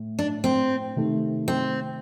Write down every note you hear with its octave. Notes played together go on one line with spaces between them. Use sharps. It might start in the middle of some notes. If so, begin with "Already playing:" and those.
Already playing: A2
D4
C4
C3 D#3 A3
C4